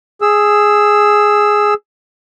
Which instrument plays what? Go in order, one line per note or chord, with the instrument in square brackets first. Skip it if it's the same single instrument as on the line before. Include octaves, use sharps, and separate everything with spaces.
[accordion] G#4 E6